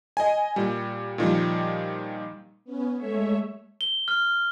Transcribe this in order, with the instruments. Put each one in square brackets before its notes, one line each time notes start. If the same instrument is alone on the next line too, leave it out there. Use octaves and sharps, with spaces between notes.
[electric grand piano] D#5 G#5
A#2 G3
A#2 D#3 F3 G3
[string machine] B3 C#4
G#3 A3 C#5 E5
[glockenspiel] G7
F6